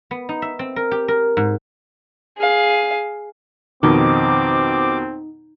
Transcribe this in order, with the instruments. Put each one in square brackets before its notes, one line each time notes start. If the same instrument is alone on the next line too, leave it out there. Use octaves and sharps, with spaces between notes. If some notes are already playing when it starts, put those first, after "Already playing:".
[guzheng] B3
D#4
E5
C4
A#4
G4
A#4
G#2
[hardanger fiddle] G#4 F5
[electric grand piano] F2 B2 D#3 [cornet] C4 [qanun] D#4 [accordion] D6